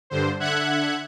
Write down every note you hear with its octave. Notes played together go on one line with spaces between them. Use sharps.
G2 D3 C5
D3 E5 F#5 F#6 G#6